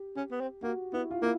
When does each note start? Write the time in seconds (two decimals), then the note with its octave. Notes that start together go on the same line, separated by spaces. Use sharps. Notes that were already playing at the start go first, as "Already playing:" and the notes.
Already playing: G4
0.17 C#4
0.31 B3
0.40 C4
0.62 A#3 F#4
0.93 B3 E4
1.11 F4
1.22 A#3 E4